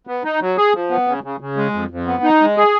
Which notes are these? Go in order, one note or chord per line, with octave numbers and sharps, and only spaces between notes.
B3
D#4
F#3
G#4
F3
B3
C#3
C#3
C#3
G#3
F2
F2
B3
D#4
G#3
G#4